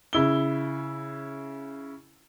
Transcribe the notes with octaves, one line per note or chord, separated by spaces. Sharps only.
C#3 E4 G7